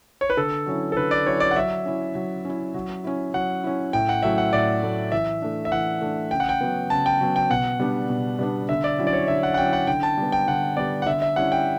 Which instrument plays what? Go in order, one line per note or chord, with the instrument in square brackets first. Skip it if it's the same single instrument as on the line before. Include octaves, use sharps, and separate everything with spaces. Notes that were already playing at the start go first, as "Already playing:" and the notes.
[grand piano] C#5
B4
[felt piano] D3 [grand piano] A4
[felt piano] F#3 C#4 E4
[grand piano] A4
[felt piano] D3 [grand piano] B4
[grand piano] D5
[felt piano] F#3 C#4 E4 [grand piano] C#5
[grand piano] D5
F#5
[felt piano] F#3 [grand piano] E5
[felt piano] C#4 E4
F#3
C#4 E4
F#3
C#4 E4
[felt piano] F#3 [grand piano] F#5
[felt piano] C#4 E4
[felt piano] A2 [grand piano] G5
[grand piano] F#5
[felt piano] F#3 A3 E4 [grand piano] E5
[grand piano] F#5
[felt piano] A2 [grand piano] D5
[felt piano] F#3 A3 E4
[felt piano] E3 [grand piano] E5
[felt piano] A3 D4
[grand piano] E5
[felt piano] E3 [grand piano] F#5
[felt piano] A3 D4
[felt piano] C#3 [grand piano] G5
[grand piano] F#5
G5
[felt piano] F#3 B3
[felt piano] C#3 [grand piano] A5
[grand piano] G5
[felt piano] F#3 B3
[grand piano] G5
[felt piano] B2 [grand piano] F#5
[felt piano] G3 B3 D4
B2
G3 B3 D4
[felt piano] D3 [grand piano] E5
[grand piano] D5
[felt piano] F#3 C#4 E4
[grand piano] D5
C#5
[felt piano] D3 [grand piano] E5
[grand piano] F#5
F#5
[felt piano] F#3 C#4 E4 [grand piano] G5
[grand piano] F#5
[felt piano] D3 [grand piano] G5
[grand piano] A5
[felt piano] G3 B3
[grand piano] G5
[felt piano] D3 [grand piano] F#5
[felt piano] G3 B3 [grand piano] D5
[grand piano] F#5
[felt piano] D3 [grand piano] E5
[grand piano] E5
[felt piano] G3 C#4 E4 [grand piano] F#5
[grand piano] G5